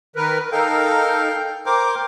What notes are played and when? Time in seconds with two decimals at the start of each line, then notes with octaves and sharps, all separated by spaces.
0.16 D#3 A#4 B4
0.52 D#4 A4 A#4 F5 G5
1.66 A#4 C5 G5 D6